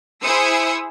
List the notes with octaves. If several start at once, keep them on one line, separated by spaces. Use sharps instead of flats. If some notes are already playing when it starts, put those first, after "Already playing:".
E4 G#4 C5 D#6 E6 C#7